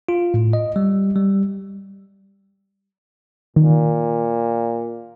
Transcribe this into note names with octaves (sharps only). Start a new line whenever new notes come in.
F4
A2
D#5
G3
G3
A#2 D#3